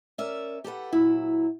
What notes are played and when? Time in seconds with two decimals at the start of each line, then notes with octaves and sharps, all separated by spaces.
0.18 C#4 A#4 D5 E5
0.64 G4 A4 B4 F#5
0.92 A#2 F#3 E4